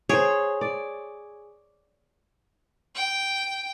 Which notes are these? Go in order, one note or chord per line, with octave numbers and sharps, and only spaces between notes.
G#4 C5 C#5
D5
G5